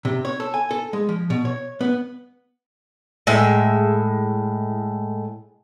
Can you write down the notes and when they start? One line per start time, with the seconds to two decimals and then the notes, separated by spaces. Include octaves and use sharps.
0.05 C3
0.25 C#5
0.40 A4
0.54 G#5
0.71 A4
0.93 G#3
1.09 F3
1.30 B2
1.45 C#5
1.81 B3
3.27 A2 G#3 E5